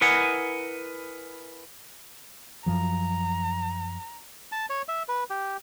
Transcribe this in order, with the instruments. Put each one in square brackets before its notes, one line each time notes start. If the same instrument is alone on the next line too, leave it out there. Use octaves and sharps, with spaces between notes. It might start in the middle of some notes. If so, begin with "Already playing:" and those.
[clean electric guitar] E4 A#4 B4 D#5 F#5 G#5
[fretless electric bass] F#2 F3 F#3 [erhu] A#5
[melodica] A5
C#5
E5
B4
G4